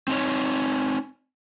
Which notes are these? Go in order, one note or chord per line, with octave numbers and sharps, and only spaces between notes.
C4 D#4 C#5